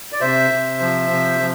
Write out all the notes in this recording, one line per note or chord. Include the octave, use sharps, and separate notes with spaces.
D5
C3 C5 E5
C3
F3
C3
F3